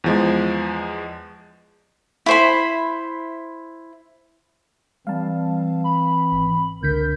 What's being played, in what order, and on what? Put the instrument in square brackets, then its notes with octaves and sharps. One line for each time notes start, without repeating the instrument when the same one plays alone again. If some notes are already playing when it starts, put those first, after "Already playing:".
[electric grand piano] E2 F3 G#3
[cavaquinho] E4 C5 B5
[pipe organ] E3 C4 [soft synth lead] G3 [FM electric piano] F5 A5
[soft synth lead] B5
[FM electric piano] G#1
[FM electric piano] C#2 D3 B6 [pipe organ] A#4 [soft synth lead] G6